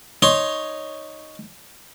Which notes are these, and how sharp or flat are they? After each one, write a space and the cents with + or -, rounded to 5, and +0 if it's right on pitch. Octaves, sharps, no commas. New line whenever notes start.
D#4 +0 C#5 +0 C6 +20